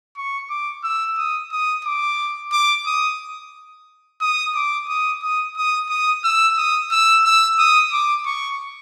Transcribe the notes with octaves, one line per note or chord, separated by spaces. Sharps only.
C#6
D6
E6
D#6
D#6
D6
D6
D#6
D#6
D6
D#6
D#6
D#6
D#6
E6
D#6
E6
E6
D#6
D6
C#6